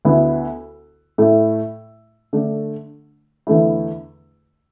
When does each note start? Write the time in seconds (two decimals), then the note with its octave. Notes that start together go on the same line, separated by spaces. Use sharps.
0.05 D2 D3 B3 E4
1.18 A2 A3 E4
2.33 D3 A3 D4
3.47 E2 D3 A3 E4